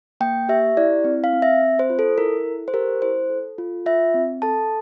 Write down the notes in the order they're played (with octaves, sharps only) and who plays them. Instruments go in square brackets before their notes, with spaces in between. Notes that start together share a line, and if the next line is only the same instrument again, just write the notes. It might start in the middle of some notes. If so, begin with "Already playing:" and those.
[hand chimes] A#3 G5
G4 E5
E4 D5
C4
F5
C4
E5
C4
C5
F4
A4
E4 A#4
A4
C5
G4 A#4
E4 C5
A4
F4
F4 E5
C4
A4 A5